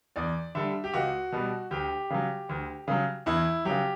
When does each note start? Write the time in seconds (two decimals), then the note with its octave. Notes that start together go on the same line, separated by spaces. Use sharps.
0.16 E2 D5
0.55 D3 G3 E5
0.84 G4
0.94 C#2 F#4
1.32 B2 G3
1.71 D2 G4
2.10 C#3 F#3
2.49 D2
2.88 C#3 F#3
3.26 E2 E4
3.65 C#3 F#3 G4